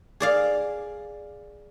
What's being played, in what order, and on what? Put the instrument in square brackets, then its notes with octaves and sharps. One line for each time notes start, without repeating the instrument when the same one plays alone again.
[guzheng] G#4 D5 F5